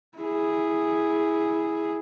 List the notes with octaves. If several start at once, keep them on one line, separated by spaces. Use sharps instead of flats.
E4 G#4